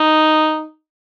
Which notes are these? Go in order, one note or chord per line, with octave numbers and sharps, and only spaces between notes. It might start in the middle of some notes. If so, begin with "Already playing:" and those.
Already playing: D#4